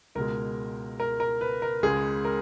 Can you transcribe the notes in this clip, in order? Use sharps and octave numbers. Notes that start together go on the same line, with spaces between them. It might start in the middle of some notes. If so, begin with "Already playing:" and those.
C#2 B2 G#3 A#4
A#4
A#4
B4
A#4
C#2 C#3 G#3 G#4
A#4